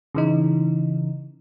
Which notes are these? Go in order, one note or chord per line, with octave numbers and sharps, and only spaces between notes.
C#3 E3 D#4